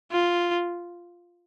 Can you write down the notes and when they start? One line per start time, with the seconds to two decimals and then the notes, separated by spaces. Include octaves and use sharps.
0.12 F4